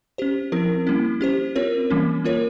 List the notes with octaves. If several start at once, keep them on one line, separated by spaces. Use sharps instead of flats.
C#4 G4 C5
F3 C4 E4 A#4
G3 A#3 C#4 E4
C#4 G4 C5
C4 F4 A#4 C#5
E3 G3 A#3 C#4
A#3 F4 A#4 C#5